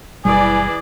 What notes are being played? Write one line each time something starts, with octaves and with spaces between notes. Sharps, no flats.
F#1 B2 E3 G3 G#4 D5 G#5